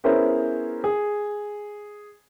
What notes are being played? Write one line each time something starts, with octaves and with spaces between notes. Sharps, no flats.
B3 C#4 E4 G#4 A#4 C5
G#4